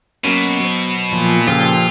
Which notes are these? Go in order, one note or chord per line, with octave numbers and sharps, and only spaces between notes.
B2 F#3 A#3 C#4
F#3 C5
A#2 F3
C#3 F3 F4 G4 A4